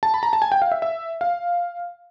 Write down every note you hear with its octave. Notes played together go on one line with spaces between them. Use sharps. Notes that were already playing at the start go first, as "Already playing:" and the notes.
A5
B5
A#5
A5
G#5
G5
F5
E5
E5
F5